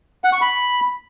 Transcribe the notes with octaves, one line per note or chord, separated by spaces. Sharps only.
F#5
C#6
B5